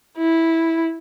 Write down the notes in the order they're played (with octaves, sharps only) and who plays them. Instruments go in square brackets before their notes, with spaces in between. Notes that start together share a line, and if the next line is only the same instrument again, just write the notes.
[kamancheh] E4